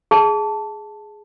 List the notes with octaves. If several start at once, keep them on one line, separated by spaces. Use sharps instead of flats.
G#4 A5